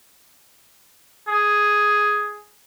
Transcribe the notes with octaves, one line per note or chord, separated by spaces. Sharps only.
G#4